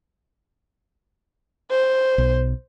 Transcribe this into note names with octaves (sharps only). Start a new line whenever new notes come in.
C5
B1